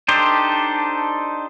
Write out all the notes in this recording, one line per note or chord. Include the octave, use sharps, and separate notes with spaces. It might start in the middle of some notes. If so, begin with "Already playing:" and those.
D4 D#4 G4 A4 C5